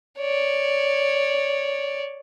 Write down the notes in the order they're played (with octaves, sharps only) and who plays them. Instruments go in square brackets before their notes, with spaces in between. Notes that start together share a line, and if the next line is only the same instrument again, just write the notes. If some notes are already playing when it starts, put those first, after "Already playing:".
[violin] C#5 D5